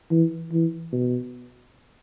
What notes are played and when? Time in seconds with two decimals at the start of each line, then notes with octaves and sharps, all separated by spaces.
0.11 E3
0.52 E3
0.93 B2